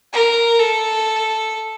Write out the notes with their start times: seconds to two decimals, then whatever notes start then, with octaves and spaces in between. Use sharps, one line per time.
0.13 A#4
0.59 A4